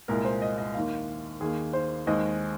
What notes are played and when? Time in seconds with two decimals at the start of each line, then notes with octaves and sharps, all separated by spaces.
0.08 C2 A#2 G#3 A#4
0.25 C5
0.42 D#5
0.58 D#5
0.74 D#2 D#3 A#3 F5
1.40 D#2 D#3 A#3 G#4
1.73 C5
2.06 D#2 D#3 G#3 C4 D#5